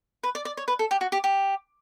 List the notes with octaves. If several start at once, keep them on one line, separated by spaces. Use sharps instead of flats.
B4
D5
D5
C#5
B4
A4
G4
F#4
G4
G4